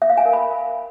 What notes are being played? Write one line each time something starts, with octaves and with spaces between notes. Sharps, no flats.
E5
F5
G#5
A#4
B5